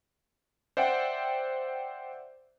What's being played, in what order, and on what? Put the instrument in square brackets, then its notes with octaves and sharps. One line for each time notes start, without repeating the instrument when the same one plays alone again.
[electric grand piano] C5 D5 E5 F#5 G5